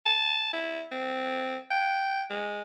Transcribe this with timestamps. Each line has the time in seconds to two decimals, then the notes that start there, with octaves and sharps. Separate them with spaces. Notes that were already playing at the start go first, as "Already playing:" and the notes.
0.06 A5
0.53 E4
0.92 C4
1.71 G5
2.30 G#3